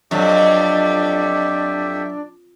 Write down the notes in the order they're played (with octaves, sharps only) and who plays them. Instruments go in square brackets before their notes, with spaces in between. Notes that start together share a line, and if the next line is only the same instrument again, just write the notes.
[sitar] F2 [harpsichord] F#3 [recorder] D4 [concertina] G4 E5